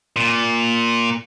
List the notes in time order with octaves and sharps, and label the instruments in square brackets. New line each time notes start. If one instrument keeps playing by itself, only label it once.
[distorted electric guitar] A#2